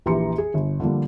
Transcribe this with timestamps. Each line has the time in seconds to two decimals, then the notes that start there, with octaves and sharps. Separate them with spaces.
0.06 A#1 E3 G4 A#5 C6 C#7
0.38 G#4
0.54 G1
0.80 D3 F3 G3 A#3